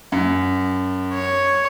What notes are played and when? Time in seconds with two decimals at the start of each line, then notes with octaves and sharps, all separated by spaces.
0.12 F#2
1.14 C#5